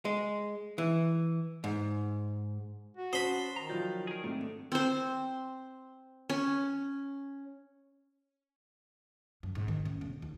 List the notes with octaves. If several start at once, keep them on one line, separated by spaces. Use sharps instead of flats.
G#3
E3
G#2
F#4
C#4 C5 A5 B5 C6 D#6
D#3 A#5
F3 F#3 D5 G6
G#4 A#4
G#2 A3 C4 D4 A4
C4 C5
C#4
F#2
G#2
D#3
C#3
E1
D#2